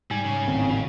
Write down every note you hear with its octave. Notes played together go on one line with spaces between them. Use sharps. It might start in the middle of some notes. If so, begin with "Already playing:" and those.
G#2 G3 G#5
C#3
D1 G#1 C4